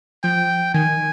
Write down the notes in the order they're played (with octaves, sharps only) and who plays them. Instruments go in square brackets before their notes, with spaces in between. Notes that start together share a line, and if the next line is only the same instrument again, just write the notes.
[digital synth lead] F3 [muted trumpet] G5
[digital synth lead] D#3 [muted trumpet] G#5